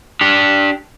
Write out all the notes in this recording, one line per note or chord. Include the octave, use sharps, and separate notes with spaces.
D4 G4